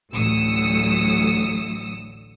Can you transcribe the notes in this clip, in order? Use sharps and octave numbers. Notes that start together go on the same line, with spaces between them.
A1 D2 F#3 D#6 E6 C#7